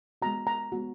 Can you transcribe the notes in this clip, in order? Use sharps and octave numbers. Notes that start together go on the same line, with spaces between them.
G#3 B3 F#4 A#5
A#5
G#3 B3 F#4